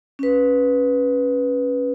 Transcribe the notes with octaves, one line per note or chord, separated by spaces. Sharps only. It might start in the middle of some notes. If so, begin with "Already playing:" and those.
C#4 B4